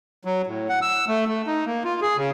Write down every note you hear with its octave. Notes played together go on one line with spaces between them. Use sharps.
F#3
A2
F#5
E6
A3
A3
D#4
A#3
F4
G#4
C#3